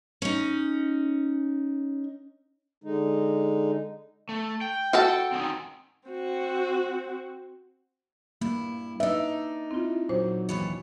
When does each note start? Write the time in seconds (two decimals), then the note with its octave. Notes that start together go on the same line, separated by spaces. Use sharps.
0.22 C#4 D#4
2.84 D3 G#3 D#4
4.29 A3
4.61 G5
4.93 F#4 A4 A5
5.32 C4 C#4 D#4
6.09 C4 F#4
8.41 G2 A#3 E4
9.00 D4 D#4 B4 E5
9.71 C4 E4 F4
10.09 A#2 F#3 C5
10.49 D#2 E3 C#5